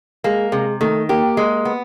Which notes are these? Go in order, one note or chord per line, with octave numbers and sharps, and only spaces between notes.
G#3 A#3
C3 G#3
D#3 A3
A#3 G4
G#3
B3